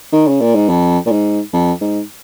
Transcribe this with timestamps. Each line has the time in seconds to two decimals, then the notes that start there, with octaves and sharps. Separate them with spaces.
0.12 D#3
0.28 C#3
0.41 A#2
0.55 G#2
0.69 F2
1.06 A#2
1.11 G#2
1.53 F2
1.81 G#2